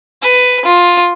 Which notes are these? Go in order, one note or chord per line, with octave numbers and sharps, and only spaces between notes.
B4
F4